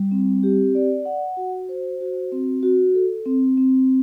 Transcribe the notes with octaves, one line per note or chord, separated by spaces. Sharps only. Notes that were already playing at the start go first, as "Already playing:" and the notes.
Already playing: G3
C4
G4
D5
F#5
F#4
C5
F#4
C4
F#4
A4
C4
C4